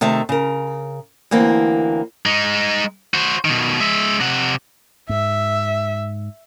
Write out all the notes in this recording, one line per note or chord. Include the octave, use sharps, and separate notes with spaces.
C3 D#3 A3 E5 A5
C#3 A#4
D2 E3 A#3 C4
G#3 D#4
F#4 C5
B2 D#3
G#3 E5
C3 F#5
G#2 E5